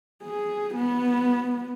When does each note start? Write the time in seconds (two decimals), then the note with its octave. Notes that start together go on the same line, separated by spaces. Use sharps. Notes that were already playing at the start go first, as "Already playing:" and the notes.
0.23 G#4
0.75 B3